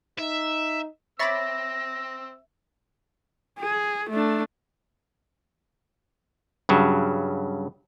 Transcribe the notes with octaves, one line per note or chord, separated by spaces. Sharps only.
D#4 E5
C4 C#5 E5 B5 D6 E6 A6 A#6
G#4
A3 D4
G2 C#3 F#3